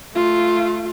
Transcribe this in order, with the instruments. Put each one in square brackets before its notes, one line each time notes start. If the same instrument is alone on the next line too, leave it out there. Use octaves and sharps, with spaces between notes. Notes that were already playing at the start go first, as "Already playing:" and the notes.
[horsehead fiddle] A3 F4